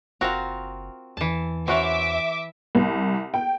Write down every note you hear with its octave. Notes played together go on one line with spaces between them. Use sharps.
F#1 C4 F4 F#4 A#4
E2 E3 A5
E3 C#4 F#4 C5 E5 D6
C2
G5